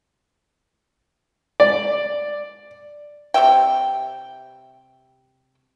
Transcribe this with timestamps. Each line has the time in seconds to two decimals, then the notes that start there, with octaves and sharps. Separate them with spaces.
1.60 D5
3.34 C3 G3 E5 G5